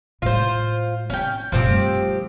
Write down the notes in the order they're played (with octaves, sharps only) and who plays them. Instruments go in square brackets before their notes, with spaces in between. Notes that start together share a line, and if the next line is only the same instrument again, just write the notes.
[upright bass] A2 G#3 [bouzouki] F4 C5
[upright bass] B3 [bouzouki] C#4 G5
[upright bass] F#2 A#2 [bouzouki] F3 C4 G4
[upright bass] G3 A3